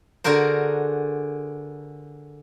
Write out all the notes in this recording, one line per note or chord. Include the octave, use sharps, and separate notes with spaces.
D3 F#4 G#4 A#4 C5